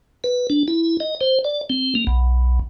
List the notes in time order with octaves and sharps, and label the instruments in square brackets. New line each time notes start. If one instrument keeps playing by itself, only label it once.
[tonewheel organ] B4
D4
E4
D#5
C5
D5
C4
A#3
B1